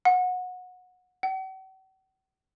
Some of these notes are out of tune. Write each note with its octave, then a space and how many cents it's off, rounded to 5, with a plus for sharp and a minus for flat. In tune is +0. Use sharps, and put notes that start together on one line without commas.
F#5 -20
F#5 +45